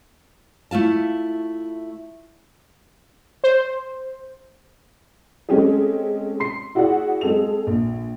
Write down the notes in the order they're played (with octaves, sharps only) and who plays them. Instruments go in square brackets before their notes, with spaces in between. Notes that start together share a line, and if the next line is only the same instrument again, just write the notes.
[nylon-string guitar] A3 E4 F4 A5
[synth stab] C5
[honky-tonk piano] G#3 A3 C4 C#4 G4 G#4
C6 C7
E4 F#4 G#4 D5 F#5
G#3 C4 G#4 A4 F7
A#1